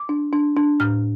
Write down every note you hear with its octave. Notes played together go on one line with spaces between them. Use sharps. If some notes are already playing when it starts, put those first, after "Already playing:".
Already playing: D6
D4
D4
D4
A2 F6